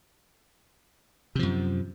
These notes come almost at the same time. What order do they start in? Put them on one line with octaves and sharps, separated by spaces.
C3 F3 F#2